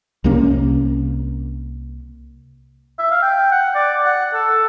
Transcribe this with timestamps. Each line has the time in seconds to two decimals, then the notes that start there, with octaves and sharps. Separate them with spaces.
0.24 C2 C3 A#3 C#4
2.99 E5
3.11 F5
3.22 G5
3.52 F#5
3.75 D5
4.05 F#5
4.34 A4